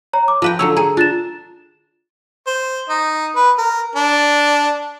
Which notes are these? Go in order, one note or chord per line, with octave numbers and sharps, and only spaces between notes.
C#5 A#5
D6
F3 F4 B4 F5 G5
D3 F#3 C#5 E6
G#4 A#5
D4 F4 A6 E7
C5
D#4
B4
A#4
D4